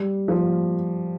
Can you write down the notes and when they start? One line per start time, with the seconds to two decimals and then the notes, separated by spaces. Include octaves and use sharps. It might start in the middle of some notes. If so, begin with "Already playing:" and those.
Already playing: G3
0.28 F3